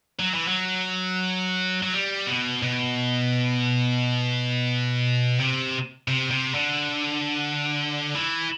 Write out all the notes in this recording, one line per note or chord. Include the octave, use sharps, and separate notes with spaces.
F#3
E3
F#3
F#3
G3
B2
B2
C3
C3
C3
D3
E3